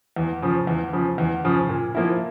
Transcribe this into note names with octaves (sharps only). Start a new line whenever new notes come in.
E2
C#3 F3
E2
C#3 F3
E2
C#3 F3
A#2
F3 A#3 E4